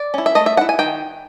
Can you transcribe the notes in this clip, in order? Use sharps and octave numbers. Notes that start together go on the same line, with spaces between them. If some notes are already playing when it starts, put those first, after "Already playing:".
Already playing: D5
C#4 E4
E5
A3 D#5
E5
C#4 E4 F#5
G#5
D#3 G5